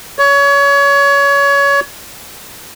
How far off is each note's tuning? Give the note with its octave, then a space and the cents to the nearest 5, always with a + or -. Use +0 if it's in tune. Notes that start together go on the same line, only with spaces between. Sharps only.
C#5 +25